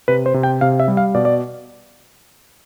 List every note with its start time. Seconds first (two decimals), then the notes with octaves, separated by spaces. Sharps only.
0.08 C3 B4
0.26 C5
0.34 C3
0.43 G5
0.61 C3 F5
0.80 E5
0.88 G3
0.97 F5
1.15 B2 D5
1.25 D5